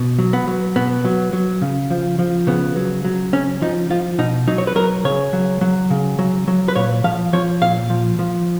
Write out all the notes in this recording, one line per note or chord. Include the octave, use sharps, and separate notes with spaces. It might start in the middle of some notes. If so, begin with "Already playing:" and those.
Already playing: B2
F#3
B3
F#3
B2 B3
F#3
F#3
C#3
F3
F3
C#3 B3
F#3
F#3
C#3 C#4
F3 D#4
F3 F4
B2 D#4
F#3 D#4
C#5
B4
F#3 A#4
C#3 C#5
F#3
F#3
C#3
F#3
F#3
B4
A#2 C#5
F3 F5
F3 C#5
A#2 F5
F3
F3